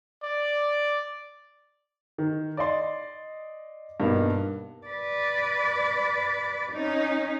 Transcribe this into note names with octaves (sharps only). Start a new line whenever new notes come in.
D5
D#3
D5 D#5 C6 A6
G2 B2 A#3 B3 D#4
B4 D5
C#4 D#4